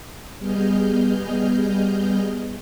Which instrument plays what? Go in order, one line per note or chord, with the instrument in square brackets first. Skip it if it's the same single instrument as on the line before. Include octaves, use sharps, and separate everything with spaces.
[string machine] G3 B3 G#4 D#5 F6 G6